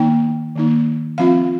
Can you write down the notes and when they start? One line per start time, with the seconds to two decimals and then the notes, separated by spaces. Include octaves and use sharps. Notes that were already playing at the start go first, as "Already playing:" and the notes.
Already playing: D#3 A#3 D#4 G5
0.55 D#3 A#3 D#4
1.18 F3 C4 F4 F5